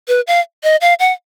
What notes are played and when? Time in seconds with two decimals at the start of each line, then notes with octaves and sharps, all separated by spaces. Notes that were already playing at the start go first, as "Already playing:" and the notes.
0.08 B4
0.27 F5
0.64 D#5
0.81 F5
1.00 F#5